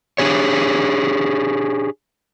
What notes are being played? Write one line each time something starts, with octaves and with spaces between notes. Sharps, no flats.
D4 G4 G#4 C#5